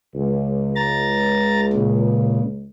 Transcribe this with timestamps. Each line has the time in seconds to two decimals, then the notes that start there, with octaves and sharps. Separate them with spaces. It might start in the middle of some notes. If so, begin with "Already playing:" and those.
0.14 C#2
0.76 A#5 A6
1.73 A#2 C#3